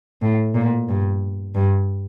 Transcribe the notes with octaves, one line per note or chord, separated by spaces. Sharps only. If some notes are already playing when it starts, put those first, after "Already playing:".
A2
A#2
G2
G2